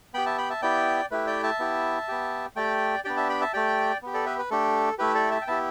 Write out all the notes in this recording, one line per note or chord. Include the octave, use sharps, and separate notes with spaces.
B3 G4 G5 B5
E5 A5
G5 B5
E5 A5
B3 E4 G4 D5 G5
A3 E4 G4 B4
D5 G5
E5 A5
B3 E4 G4
B3 G4
A3 G4 D5 G5
B3 D4 G4 D5 G5
E5 A5
G5 B5
E5 A5
A3 G4 D5 G5
B3 G4
A4 D5
B4 E5
B4
A3 D4 G4 A4
A3 E4 G4 B4
A4 D5
E5 A5
G5
B3 E4 G4 E5 A5